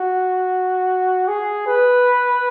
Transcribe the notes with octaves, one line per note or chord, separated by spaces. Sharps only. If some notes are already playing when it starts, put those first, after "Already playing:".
Already playing: F#4
G#4
B4